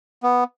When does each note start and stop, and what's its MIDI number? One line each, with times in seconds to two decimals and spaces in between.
0.23 0.44 59